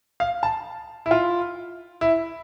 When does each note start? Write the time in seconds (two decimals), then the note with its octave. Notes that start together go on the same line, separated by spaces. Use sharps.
0.20 F5
0.43 A5
1.06 E4
1.11 F4
2.01 E4